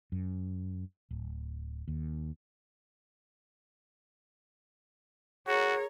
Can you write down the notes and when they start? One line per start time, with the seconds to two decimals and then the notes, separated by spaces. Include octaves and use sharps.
0.12 F#2
1.11 D1
1.88 D#2
5.47 F#4 G#4 A#4 C#5